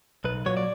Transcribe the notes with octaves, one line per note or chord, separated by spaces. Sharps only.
B1 B4
A#2 F#3 C#5
D5